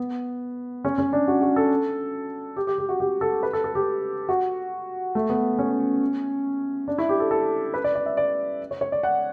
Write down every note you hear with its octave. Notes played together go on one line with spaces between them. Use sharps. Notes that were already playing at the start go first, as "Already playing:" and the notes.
Already playing: B3
C#4
C#4
D4
F#4
F#4
A4
G4
G4
G4
F#4
G4
A4
B4
A4
A4
G4
F#4
A3
B3
C#4
D4
E4
G4
A4
A4
B4
D5
D5
E5
D5
C#5
C#5
D5
F#5